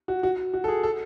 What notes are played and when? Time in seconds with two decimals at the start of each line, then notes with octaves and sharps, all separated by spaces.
0.08 F#4
0.23 F#4
0.54 F#4
0.64 A4
0.68 G#4
0.83 A4